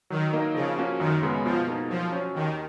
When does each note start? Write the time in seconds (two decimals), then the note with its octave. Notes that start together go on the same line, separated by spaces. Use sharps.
0.10 D#3 F#3
0.33 A#3 D#4 A#4 D#5
0.54 C#3 F3
0.78 A#3 C#4 F#4
0.99 F#2 D#3
1.22 C#3 G#3 B3
1.45 B2 F3
1.67 A#3 D#4 G#4
1.90 F3 F#3
2.12 C#4 F#4 C#5
2.35 D#2 D#3